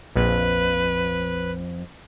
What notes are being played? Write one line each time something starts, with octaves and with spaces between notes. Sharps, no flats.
A#1 F2 B4